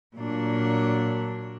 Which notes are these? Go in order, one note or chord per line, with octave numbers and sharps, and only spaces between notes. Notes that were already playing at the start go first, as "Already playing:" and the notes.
A#2 F#3 A#3 D4